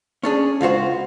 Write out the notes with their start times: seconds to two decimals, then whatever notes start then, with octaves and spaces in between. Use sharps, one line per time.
0.23 C#4 D4 G#4
0.61 C#2 F4 F#4 C5